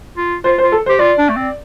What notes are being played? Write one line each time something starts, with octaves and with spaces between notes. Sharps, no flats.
F4
F4 C5
C5
F4
A4
C5
G4
F4 D5
D4
A3
C4